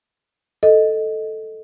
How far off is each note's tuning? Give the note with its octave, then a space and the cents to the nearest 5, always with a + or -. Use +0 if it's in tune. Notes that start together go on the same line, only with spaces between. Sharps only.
A4 +0 D#5 +0